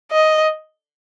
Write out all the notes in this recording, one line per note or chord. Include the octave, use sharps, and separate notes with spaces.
D#5